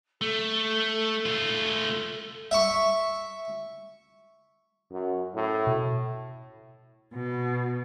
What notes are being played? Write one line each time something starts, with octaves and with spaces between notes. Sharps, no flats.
A3 A4
A3 F4
E5 C#6
F#2
A2
B2
B2